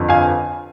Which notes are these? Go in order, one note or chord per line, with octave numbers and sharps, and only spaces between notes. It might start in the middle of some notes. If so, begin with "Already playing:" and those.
Already playing: G1 F2 D3 F3
F5 G#5